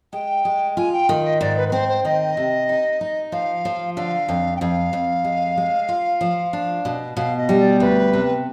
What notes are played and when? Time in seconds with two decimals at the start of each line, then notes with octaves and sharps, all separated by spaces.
0.13 G#3 G5
0.45 G#3
0.77 F4 G#5
0.93 G5
1.09 D#3
1.24 D#5
1.41 G#2 D5
1.57 B4
1.69 B4
1.72 C4 C5
1.89 C5
2.05 D#3 D#5
2.37 C3
2.69 D#4
3.01 D#4
3.32 F3 F5
3.65 F3
3.97 D3 F5
4.29 F2
4.56 G5
4.61 F2 F5
4.93 F2
5.24 G#3
5.57 G#3
5.89 F4
6.21 F3
6.53 D4
6.85 B2
7.17 B2 F5
7.38 D#5
7.49 G3
7.60 D5
7.80 D2 B4
8.13 C3